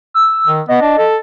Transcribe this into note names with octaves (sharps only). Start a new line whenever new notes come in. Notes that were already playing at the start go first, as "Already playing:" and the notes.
E6
D#3
B3 D#5
D4
A4